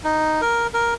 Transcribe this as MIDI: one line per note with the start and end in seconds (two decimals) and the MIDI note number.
0.04 0.41 63
0.42 0.67 70
0.74 0.94 70